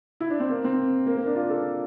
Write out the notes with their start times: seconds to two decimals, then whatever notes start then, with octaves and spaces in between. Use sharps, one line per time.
0.20 E4
0.30 D4
0.40 C4
0.50 A#3
0.64 C4
1.06 A#3
1.17 A#3
1.26 D4
1.35 F4
1.50 A4